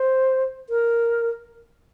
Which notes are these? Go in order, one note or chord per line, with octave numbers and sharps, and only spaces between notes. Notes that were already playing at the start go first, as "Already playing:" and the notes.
Already playing: C5
A#4